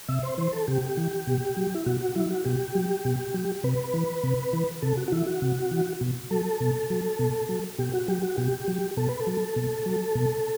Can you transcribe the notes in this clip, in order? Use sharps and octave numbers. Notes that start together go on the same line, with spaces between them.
C3 E5
C5
E3 C5
A4
C3 G4
E3
B2
F#3
E4
B2 F#4
F#4
F#3 E4
F#4
B2 G4
F#3
B2
F#3
C3 B4
E3
C3
E3
C3 A4
F#4
F#4
E3 E4
F#4
C3
E3
B2
F#3 A4
B2
F#3
B2
F#3
B2 G4
F#4
F#3 G4
F#4
B2 G4
F#3
B2 A4
B4
A4
F#3
B2
F#3
B2